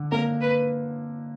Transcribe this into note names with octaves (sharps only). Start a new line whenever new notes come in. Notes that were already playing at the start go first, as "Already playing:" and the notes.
Already playing: D3
A#3 A#4
B4